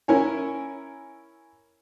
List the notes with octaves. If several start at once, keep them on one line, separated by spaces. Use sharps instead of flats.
C#4 E4 A#4 C#5 G#5